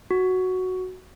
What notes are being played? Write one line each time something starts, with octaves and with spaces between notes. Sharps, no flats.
F#4